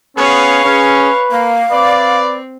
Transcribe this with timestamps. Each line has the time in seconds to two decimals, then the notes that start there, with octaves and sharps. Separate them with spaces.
0.17 B3 C#4 G#4 B4 C#5 F5
0.64 C#4 G#4 B4
1.32 A#3 F5
1.71 C4 B4 D5